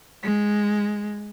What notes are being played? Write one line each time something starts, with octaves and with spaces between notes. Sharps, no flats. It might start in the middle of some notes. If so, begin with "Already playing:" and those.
G#3